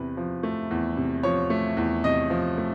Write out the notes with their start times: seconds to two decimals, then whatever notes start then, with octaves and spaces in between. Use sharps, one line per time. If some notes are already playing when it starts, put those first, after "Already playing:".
Already playing: E2 C3 B4
0.17 F3
0.43 A3
0.71 E2
0.97 C3
1.23 F3 C#5
1.50 A3
1.77 E2
2.04 C3 D#5
2.30 F3
2.58 A3